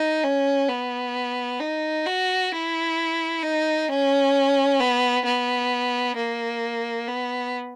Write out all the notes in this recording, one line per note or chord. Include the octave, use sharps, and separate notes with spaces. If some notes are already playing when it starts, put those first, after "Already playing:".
Already playing: D#4
C#4
B3
D#4
F#4
E4
D#4
C#4
B3
B3
A#3
B3